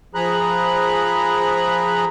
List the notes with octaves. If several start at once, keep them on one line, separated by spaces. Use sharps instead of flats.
F3 G#4 A#5 B5 F#6